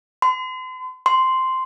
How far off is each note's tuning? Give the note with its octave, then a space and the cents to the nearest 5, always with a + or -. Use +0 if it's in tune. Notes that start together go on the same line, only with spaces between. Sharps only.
C6 -40
C6 -5